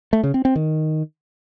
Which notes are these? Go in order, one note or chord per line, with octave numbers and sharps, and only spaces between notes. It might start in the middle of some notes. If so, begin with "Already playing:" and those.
A3
C#3
C4
C4
D#3